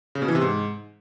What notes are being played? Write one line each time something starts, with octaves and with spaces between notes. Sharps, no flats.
C#3
B2
E3
C3
G#2